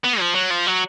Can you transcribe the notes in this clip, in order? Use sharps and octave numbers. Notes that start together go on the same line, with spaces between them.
B3
F3
F#3
F3
F#3